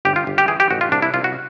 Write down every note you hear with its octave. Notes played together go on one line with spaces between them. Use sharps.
G1 G4
F4
G1
G4
E3 G#4
G4
A1 F#4
F4
C2 D4
E4
C2 F4
F#4